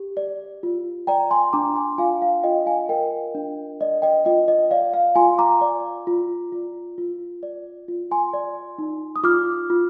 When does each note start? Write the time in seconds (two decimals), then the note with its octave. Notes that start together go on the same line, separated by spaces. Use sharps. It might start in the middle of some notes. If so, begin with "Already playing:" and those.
Already playing: G4
0.17 D5
0.63 F4
1.07 D5 G5 A#5
1.31 G#5 C6
1.53 D4 A#5 D6
1.75 G#5 C6
1.98 F4 F5 G#5
2.22 F5
2.43 F4 D#5 G5
2.66 F5 G#5
2.89 A#4 D#5 G5
3.35 D4
3.81 D5 D#5
4.02 D#5 G5
4.25 F4 D#5 G5
4.48 D#5
4.71 D5 F5
4.94 F5
5.15 F4 G#5 C6
5.38 A#5 D6
5.61 D5
6.07 F4
6.52 F4
6.98 F4
7.43 D5
7.88 F4
8.11 G#5 C6
8.34 D5
8.78 D#4
9.16 D#6
9.24 F4 D6 F6
9.70 F4